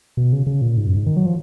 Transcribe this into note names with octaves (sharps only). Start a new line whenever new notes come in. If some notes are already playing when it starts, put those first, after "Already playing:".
B2
C#3
C#3
A#2
G#2
F#2
G#2
D#3
F#3
F3